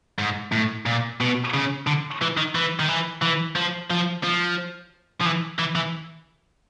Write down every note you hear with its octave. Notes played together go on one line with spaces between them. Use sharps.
G#2
A2
A#2
B2
C#3
D3
E3
D#3
E3
D#3
E3
E3
F3
F3
F3
F3
E3
E3
E3